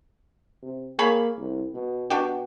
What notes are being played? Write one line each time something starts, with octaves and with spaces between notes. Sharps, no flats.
C3
A#3 G#4 C#5 B5
C2
B2
B2 D4 F#4 G4